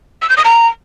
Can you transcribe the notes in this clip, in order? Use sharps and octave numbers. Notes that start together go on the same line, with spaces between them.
E6
G6
D#6
A#5